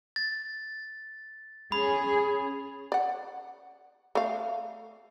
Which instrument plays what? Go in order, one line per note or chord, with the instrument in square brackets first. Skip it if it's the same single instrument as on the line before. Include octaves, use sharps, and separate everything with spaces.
[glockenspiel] A6
[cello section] C#4 G#4 [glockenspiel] B5
[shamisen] D5 F#5
A3 F5